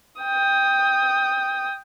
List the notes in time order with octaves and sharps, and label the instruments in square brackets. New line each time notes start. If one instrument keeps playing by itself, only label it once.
[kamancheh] G5 D#6